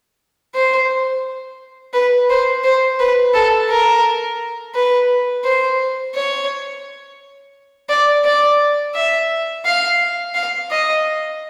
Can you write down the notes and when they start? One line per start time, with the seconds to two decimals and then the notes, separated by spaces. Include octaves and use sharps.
0.55 C5
1.94 B4
2.30 C5
2.64 C5
2.99 B4
3.34 A4
3.69 A#4
4.75 B4
5.44 C5
6.15 C#5
7.89 D5
8.25 D5
8.95 E5
9.66 F5
10.35 F5
10.71 D#5